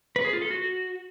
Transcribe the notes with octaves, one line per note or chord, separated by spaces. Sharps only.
B4
G#4
F4
A4
F#4